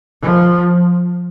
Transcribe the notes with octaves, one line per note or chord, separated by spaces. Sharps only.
F3